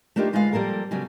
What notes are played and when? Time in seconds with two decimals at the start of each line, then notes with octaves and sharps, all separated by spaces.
0.16 A3 A#3 D4 D#4 F4 G4
0.33 D2 G#3 F4 B4 C5 F5
0.53 F3 G3 A#3 A4 A#4
0.91 C#3 F#3 G3 B3